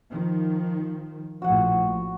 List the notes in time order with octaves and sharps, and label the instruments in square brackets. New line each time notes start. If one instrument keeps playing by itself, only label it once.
[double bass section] D#3 F3
[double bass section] A#1 A2 F3 [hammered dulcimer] F#4 F#5